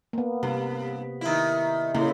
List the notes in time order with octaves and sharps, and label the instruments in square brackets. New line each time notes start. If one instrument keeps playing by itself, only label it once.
[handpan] A#3 B3
[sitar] G2 [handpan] C3
[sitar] D#3 E4
[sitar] A2 [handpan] C#3 A#3 E4